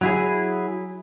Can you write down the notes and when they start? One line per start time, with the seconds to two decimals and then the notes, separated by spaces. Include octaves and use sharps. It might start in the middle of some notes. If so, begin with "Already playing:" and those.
0.01 F#3 E4 G#4